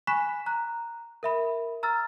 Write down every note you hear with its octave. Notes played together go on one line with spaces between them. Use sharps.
G#5 B5 C#6 F#6 B6 E7
A#5 F#6
A#4 E5 B5
A#5 E6 F6 A6